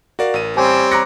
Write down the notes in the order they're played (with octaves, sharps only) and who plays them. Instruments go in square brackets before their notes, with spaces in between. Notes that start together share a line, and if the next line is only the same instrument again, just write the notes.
[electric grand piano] F#4 D5 F5 [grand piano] A#4
[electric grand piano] A1 D#7
[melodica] G3 C5 C#5 [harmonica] C4 G4 [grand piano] G#5
[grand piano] A#5 A#6 [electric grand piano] D6 F#6 C#7